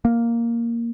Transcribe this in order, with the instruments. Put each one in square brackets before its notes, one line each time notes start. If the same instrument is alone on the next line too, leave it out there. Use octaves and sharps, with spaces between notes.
[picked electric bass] A#3